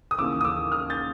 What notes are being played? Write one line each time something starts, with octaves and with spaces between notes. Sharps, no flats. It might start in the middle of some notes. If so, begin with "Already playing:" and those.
D#6
D#2 C#3 E3 D6 E6
D#6
D6 E6
D#6 F6
G6 A6